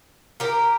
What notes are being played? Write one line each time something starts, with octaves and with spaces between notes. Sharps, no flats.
G4 A#4